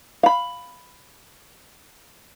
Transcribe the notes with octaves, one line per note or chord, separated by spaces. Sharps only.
F5 B5